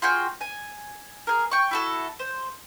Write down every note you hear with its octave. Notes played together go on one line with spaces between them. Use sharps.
F4 F#4 G#4 G5
G#5
G#4 A#4
G5 C#6
E4 F#4 A4
C5